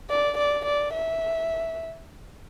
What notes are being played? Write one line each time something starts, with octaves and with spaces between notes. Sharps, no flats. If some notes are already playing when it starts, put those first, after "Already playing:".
D5
D5
D5
E5